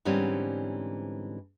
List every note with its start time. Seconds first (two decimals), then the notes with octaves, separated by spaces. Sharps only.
0.05 G#2 D3 E3 G3 C4 C#4